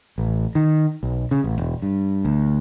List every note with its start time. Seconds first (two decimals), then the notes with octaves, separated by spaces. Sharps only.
0.18 A1
0.55 D#3
1.03 B1
1.31 C#3
1.44 A1
1.58 E1
1.82 G2
2.25 D2